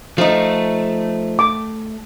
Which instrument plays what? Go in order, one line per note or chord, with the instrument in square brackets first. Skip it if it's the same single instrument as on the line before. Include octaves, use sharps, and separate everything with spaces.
[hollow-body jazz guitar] F3 D#4 [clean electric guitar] A3
[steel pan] D6